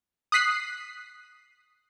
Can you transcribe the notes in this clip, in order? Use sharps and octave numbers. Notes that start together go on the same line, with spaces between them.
D#6 F#6 B6 C7